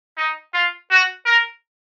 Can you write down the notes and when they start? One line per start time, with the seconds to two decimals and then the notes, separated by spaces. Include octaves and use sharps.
0.17 D#4
0.53 F4
0.91 F#4
1.26 A#4